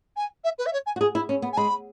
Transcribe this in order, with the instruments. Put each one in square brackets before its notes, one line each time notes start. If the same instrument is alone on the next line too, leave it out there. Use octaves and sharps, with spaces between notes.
[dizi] G#5
E5
B4
E5
C#5
G#5
[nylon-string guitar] F#4
G#4
E4
C#4
B3
[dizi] G#5
[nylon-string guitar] G#3 [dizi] B5